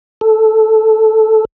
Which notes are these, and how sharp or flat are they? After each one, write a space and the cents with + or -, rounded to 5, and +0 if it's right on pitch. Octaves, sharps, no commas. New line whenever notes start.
A4 -5